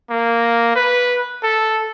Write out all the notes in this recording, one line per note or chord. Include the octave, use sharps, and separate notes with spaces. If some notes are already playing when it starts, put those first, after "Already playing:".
A#3
B4
A4